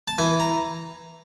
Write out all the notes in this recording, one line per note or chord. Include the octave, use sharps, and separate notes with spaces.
A5
E3 G#5
A#5